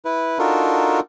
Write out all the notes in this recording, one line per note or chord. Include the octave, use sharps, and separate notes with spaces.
E4 B4
D4 D#4 F4 F#4 A4 A#4